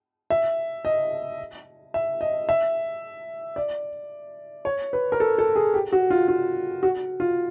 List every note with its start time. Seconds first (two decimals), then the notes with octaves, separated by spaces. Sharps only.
0.30 E5
0.85 D#5
1.94 E5
2.21 D#5
2.49 E5
3.56 D5
4.65 C#5
4.93 B4
5.12 A#4
5.20 A4
5.38 A4
5.56 G#4
5.74 G4
5.92 F#4
6.10 F4
6.28 F4
6.83 F#4
7.20 F4